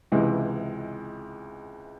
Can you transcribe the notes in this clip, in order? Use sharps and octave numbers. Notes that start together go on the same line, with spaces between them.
C#2 C3 E3 G#3